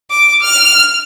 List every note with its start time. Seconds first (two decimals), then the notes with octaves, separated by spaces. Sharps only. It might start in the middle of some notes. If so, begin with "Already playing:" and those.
0.11 D6
0.42 F6